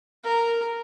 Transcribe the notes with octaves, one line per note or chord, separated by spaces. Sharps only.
A#4